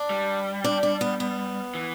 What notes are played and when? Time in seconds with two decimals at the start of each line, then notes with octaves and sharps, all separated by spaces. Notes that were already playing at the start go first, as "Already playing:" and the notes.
Already playing: D4
0.10 G3
0.64 D4
0.83 D4
1.01 B3
1.20 B3
1.74 E3